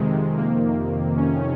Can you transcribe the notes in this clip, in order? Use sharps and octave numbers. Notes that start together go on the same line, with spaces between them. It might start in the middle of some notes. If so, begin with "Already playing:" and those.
Already playing: F2 C3 D#3 G#3
A#3
C#4